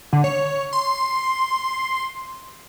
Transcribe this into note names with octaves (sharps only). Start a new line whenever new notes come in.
D3
C#5
C6